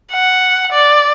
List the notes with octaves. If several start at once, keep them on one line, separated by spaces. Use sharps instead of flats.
F#5
D5